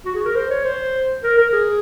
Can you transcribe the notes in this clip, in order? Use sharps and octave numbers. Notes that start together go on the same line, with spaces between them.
F#4
G#4
A#4
C5
C#5
C5
A#4
A#4
G#4